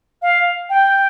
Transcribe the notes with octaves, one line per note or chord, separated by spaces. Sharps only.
F5
G5